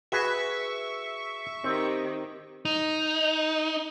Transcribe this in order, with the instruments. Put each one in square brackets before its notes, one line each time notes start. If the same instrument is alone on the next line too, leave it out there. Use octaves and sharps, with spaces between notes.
[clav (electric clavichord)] F#4 G#4 B4 [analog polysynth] E5 C#6
[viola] D#3 G4 [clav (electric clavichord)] C4
[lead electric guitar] D#4